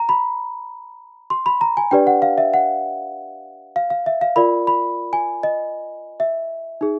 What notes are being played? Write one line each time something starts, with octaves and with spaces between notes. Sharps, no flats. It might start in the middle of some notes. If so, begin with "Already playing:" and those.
Already playing: A#5
B5
C6
B5
A#5
G#5
D4 G4 B4 D5 G5
F#5
F5
E5
F#5
F5
F5
E5
F5
F4 A#4 D5 B5
B5
G#5
D#5
E5
D#4 G#4